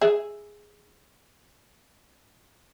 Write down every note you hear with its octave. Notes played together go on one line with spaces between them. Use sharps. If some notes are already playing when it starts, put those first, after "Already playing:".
G#4 E5